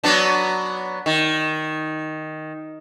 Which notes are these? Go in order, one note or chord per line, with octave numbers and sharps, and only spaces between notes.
F#3 B3 D4
D#3